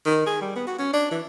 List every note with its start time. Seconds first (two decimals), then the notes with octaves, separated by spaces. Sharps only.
0.06 D#3
0.27 G#4
0.41 G3
0.56 B3
0.67 F#4
0.79 C#4
0.93 D4
1.11 E3